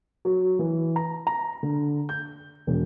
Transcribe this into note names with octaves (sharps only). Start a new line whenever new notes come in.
F#3
E3
A#5
A#5
D3
G6
E1